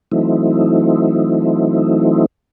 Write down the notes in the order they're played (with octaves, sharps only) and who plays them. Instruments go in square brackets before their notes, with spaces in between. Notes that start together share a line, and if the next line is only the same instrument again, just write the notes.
[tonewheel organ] E3 F#3 A3 C4 D#4 E4